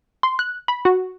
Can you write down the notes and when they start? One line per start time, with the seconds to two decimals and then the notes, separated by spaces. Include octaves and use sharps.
0.23 C6
0.39 F#6
0.68 B5
0.85 F#4